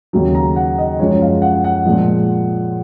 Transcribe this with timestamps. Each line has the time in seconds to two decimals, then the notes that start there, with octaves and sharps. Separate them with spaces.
0.13 D#2 C#3 F#3
0.35 A#5
0.56 F#5
0.78 D#5
0.99 F#2 F3 G#3 C#5
1.21 F5
1.42 F#5
1.64 F#5
1.85 A#2 F3 G#3